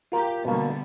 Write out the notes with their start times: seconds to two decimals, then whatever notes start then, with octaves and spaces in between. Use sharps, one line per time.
0.12 F4 G4 A#4
0.45 B2 D3 G3 A#3 B3